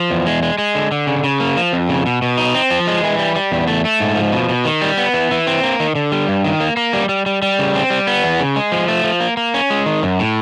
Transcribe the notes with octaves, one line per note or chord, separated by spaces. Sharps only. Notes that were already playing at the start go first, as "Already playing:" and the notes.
Already playing: F3
E2
G#3
G#3
G#3
D3
D3
C#3
C#3
A#3
F3
F2
C#3
B2
B2
D#4
C4
F3
G#3
E3
G3
G3
E2
A3
A3
G#2
F3
B2
B2
D#3
G3
B3
E3
E3
C4
A#3
D#3
D3
G3
G2
D#3
A#3
A#3
G3
G3
G3
G3
C#3
C4
G3
B3
E2
C#3
G#3
F3
A3
F3
A#3
A#3
C#4
G#3
D#3
F#2
A2